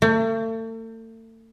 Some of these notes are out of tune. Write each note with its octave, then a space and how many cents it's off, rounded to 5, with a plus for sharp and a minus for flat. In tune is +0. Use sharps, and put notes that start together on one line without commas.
A3 +40